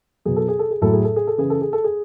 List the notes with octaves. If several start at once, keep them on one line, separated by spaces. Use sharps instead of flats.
B2 F#3 G#4
A4
G#4
A4
G#4
A2 F#3 A4
G#4
A4
G#4
A4
C#3 E3 G#4
A4
G#4
A4
G#4